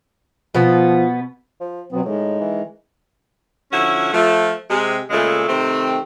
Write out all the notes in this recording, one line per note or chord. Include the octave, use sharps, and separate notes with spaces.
B2 F3 B3
F3
B2 F#3 B3 C4
A2 D#3 G#3
E3
D3 F3 C#4 E4 F#4
F3 A3
C3 G#3
A#2 C#3 G#3 A3
C3 D#3 A3 C4